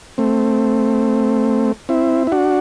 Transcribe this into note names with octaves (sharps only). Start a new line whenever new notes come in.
A3 C4
C4 E4
E4
D4 F#4